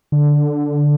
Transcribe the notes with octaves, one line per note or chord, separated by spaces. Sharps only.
D3